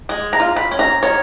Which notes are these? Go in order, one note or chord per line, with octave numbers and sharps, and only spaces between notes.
G#3
A#5
F4
B5
C#4
A#5
D#3 C#5